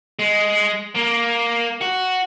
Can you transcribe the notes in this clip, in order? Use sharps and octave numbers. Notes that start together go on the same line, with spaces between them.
G#3
A#3
F#4